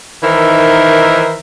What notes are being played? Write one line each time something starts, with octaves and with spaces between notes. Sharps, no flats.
D#3 E3 D#4 A#4 C5 E5